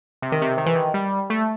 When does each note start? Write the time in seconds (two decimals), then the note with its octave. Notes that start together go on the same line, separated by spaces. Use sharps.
0.22 C3
0.32 D#3
0.42 C3
0.57 D#3
0.66 E3
0.75 D#3
0.94 G3
1.30 A3